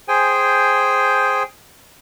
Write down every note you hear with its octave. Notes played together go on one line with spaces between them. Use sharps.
G#4 C5 G5 G#5